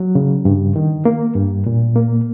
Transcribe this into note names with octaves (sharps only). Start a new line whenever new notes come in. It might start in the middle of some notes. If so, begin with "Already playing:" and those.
Already playing: F#3
C#3
G2
D#3
A#3
G2
A#2
A#3